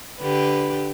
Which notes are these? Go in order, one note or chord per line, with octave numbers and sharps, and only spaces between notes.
D3 G4 B4